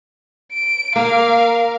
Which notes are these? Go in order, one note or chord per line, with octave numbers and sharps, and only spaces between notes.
D7
A#3 A#4 F5